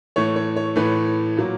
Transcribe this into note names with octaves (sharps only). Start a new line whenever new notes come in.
A2 E3 A3 C#5
C#5
C#5
A2 E3 A3 B4
A#2 F#3 A#3